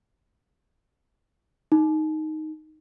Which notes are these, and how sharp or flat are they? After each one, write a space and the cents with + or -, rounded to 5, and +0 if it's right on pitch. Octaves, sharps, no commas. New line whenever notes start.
D#4 +0